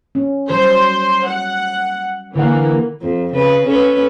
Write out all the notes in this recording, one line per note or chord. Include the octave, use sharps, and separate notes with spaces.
C#4
F#3 G3 C5
F#5
D3 E3 A#3 F#5
F2
C#3 B4
C#4 A4 B4